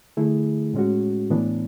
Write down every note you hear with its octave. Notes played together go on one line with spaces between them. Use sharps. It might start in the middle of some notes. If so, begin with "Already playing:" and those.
D3 A3 E4 G#4
A2 G#3 C#4 F#4
A2 E3 B3 D4